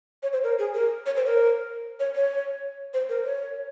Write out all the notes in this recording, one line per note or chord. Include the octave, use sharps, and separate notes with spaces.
C#5
C5
A#4
G#4
A#4
C#5
C5
A#4
C#5
C#5
C5
A#4
C#5